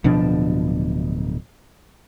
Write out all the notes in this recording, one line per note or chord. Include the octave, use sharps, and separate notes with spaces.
D1 B2 F3 D4